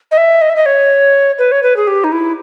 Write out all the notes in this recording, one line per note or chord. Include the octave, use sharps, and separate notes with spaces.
D#5
E5
D#5
E5
D#5
C#5
B4
C#5
B4
G#4
G4
D#4
E4